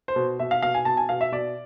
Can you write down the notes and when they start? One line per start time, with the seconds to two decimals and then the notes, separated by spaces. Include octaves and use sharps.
0.08 C5
0.16 B2
0.39 B2 E5
0.51 F5
0.62 B2 F5
0.74 G#5
0.85 B2 A5
0.97 G#5
1.09 B2 F5
1.21 E5
1.32 B2 D5